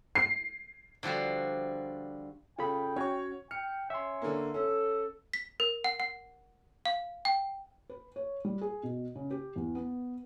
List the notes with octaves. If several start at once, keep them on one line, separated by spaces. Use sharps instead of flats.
C7
D3 F3 G3 F#4 C5
C#3 F4 A4 G5 B5
C#4 F#4 C#5 C#6
G5 F6 C#7
C#4 E5 C6
D3 A#3
C#4 A4
B6
A#4
F#5
F#5
F5
G5
B4
C#5
G3
G#4
B2
C#3
G4
E2
B3